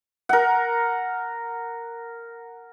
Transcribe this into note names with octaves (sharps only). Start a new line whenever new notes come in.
A#4 F#5